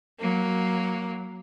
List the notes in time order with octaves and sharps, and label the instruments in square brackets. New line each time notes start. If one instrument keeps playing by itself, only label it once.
[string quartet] F#3 A#3